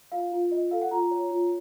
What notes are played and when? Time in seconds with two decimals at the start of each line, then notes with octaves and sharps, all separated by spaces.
0.12 F4 F5
0.32 F4
0.51 F4 D#5
0.71 A4 F5
0.81 F#5
0.91 F4 A#5
1.11 C#5
1.31 F4